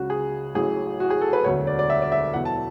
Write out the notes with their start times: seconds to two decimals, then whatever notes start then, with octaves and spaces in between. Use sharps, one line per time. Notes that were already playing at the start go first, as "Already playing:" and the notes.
Already playing: C#2 C#3 F#3 F#4
0.10 G#4
0.54 A1 A2 F#3 G#4
1.00 F#4
1.10 G#4
1.21 A4
1.33 B4
1.44 E1 D2 D3 F#3 C#5
1.67 D5
1.79 D5
1.90 E5
2.02 D5
2.12 E5
2.34 E2 B2 F#3 F#5
2.45 A5